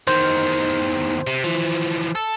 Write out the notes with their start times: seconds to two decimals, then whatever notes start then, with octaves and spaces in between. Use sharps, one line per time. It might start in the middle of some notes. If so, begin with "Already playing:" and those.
0.07 E2 D#3 C5
1.27 C3
1.44 E3 F3
2.15 A4